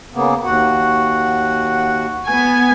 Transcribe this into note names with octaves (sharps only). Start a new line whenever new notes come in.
C#3 A#3 B3
D#2 F#4 F#5
B3 G#5